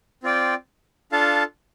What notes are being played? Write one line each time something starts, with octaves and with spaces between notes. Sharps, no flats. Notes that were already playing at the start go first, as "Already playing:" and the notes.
C4 F4 D5 G5
D4 F4 A4 F5 A5